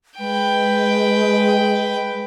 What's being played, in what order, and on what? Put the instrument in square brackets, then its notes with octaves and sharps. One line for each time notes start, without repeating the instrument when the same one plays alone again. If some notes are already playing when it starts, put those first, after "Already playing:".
[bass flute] G#3 [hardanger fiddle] B4 G5